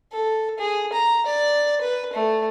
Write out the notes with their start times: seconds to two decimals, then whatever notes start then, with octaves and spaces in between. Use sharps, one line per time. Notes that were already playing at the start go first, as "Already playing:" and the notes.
0.12 A4
0.58 G#4
0.93 A#5
1.26 D5
1.81 B4
2.13 A3